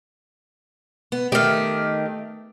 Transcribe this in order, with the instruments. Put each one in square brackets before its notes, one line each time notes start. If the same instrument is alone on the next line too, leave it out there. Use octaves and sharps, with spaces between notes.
[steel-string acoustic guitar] B3
[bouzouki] D#3 G4 [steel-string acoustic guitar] A3